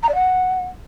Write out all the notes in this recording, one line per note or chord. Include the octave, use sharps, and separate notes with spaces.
A#5
D5
F#5